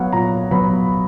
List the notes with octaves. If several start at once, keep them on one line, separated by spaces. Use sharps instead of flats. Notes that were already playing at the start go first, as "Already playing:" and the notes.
Already playing: F#3 B3 C#5 F5 F#5
A#2 A#5
F#3 B3 B5